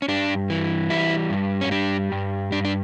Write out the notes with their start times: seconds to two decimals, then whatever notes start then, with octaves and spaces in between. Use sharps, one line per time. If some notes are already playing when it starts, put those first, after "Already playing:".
0.02 C#4
0.08 G2 D4
0.50 E3
0.90 G3 E4
1.30 G2
1.61 C#4
1.71 G3 D4
2.12 G2
2.52 G2 D4
2.65 D4